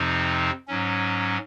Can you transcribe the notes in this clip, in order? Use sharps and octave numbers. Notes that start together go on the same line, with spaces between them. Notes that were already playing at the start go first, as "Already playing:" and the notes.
Already playing: F2 C3 F3 C4 D#4
G#2 F#3 C#4